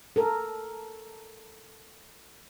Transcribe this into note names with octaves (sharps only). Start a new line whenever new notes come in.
A4 A#4